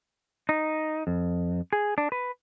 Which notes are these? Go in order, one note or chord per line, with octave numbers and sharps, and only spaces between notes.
D#4
F2
G#4
D4
B4